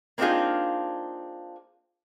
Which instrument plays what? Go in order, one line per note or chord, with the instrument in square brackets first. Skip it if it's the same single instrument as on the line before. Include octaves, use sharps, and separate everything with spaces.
[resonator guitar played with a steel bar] A#3 C4 D4 D#4 F4 G#4